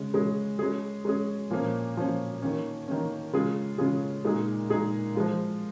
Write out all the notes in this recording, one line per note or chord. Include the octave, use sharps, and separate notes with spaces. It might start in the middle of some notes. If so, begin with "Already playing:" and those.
Already playing: C#3 G#3 C#4
C#3 G#3 C#4 G#4
G#3 C#4 G#4
G#3 C#4 G#4
A#2 F3 A#3 C#4
A#2 F3 A#3 C#4
D#3 A#3 C#4
D#3 A#3 C#4
C#3 G#3 C#4 F4 G#4
C#3 G#3 C#4 F4 G#4
A#2 G#3 D#4 G#4
A#2 G#3 D#4 G#4
F3 G#3 F4